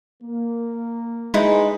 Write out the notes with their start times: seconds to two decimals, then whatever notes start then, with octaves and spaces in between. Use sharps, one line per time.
0.23 A#3
1.34 G#3 D#4 E4 B4